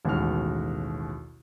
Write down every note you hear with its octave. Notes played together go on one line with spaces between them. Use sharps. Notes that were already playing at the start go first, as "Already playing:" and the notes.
A1 D#2 B2 G#3 F#4 F6